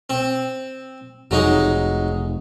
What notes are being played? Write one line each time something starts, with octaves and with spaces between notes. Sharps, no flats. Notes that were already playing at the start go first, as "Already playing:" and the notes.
C4
F1 F#3 G#3 D#4